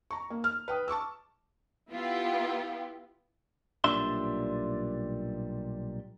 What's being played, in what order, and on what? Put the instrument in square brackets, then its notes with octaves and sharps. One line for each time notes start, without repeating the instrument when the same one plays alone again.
[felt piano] A#5 C#6
A#3
F6
B4 G5 D#6
A5 C#6 D6 E6
[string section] B3 E4 F4 G4
[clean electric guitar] B1 A#2 G3 D4 E5 C6